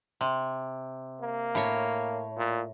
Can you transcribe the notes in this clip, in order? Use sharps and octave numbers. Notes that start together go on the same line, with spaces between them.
C3
A#3
A2 C#5
A#2